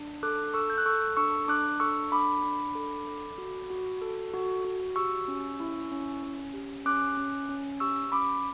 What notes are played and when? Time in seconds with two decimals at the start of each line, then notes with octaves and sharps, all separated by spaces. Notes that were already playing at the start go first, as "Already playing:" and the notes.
Already playing: D4
0.23 A4 D6 F#6
0.54 A4 C#6 E6
0.70 G6
0.78 F#6
0.86 A4 C#6 E6
1.17 D4 C#6 E6
1.48 D4 D6 F#6
1.80 A4 C#6 E6
2.12 D4 B5 D6
2.44 D4
2.75 A4
3.07 A4
3.38 F#4
3.70 F#4
4.02 A4
4.34 F#4
4.65 F#4
4.96 G4 C#6 E6
5.28 C#4
5.60 E4
5.92 C#4
6.23 C#4
6.54 G4
6.85 C#4 D6 F#6
7.17 C#4
7.49 C#4
7.80 G4 C#6 E6
8.12 C#4 B5 D6